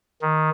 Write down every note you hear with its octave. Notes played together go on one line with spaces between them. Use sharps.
D#3